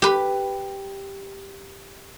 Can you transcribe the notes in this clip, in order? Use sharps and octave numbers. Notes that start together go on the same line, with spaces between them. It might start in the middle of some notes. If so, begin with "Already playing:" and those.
G4 B4